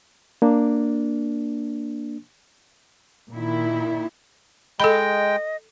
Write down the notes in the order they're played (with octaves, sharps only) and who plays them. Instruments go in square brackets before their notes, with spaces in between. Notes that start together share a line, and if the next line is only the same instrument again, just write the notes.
[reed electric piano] A#3 D4
[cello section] A#2 D#3 E4
[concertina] G#3 G5 [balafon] A4 B5 [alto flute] D#5